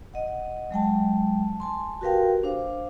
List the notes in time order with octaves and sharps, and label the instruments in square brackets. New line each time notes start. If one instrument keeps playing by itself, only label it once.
[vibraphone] D#5 F#5
F#3 G#3 G5 A5
G#5 A5 C6
F#4 G4 A#4 B4 F5 G5
D4 C5 F5